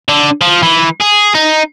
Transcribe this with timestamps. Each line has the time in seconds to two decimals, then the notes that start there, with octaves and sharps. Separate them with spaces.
0.09 D3
0.41 F3
0.63 E3
1.01 G#4
1.35 D#4